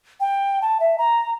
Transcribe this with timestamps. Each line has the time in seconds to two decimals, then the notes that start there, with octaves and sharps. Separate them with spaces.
0.20 G5
0.62 A5
0.80 E5
0.98 A#5